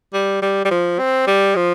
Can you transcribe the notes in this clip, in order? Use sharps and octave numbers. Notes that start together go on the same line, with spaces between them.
G3
G3
G3
F3
C4
G3
F3